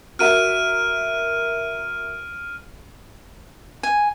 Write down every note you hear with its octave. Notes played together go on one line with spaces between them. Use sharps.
F#4 A#4 E5 F6 D7 D#7
G#5